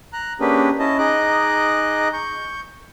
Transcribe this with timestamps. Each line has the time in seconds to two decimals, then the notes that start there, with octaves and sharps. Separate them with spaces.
0.13 A#5 F#6
0.40 A#3 C#4 D4 G4 G#4 B4
0.79 C#4 E4 D#5 A5
0.98 D#4 G#4 D#5 D6 F#6
2.13 C#6 G6